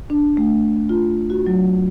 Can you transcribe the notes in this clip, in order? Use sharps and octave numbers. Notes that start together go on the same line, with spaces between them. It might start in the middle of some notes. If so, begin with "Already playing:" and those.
D4
A3
F4
F#4
F#3